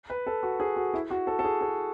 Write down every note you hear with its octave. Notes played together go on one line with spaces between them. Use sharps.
B4
A4
F#4
G#4
F#4
E4
F#4
A4
A4
G#4
G#4